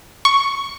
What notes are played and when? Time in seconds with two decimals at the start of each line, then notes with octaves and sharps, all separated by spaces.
0.25 C#6